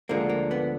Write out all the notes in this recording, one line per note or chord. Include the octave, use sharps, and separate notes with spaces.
D2 D3 F3 G#3 A#3
A#3
B3